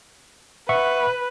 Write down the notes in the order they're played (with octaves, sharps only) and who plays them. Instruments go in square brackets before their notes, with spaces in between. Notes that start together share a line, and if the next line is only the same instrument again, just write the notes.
[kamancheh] B4 [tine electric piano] E5 F#5 C#6